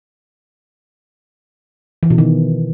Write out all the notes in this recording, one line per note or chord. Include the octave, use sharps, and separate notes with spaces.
E3
B2
D#3